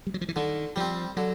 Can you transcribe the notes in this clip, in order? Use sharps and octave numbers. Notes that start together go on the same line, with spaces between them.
G3
F#3
F3
E3
D3 D#3
F3 G3 C4
D3 F#3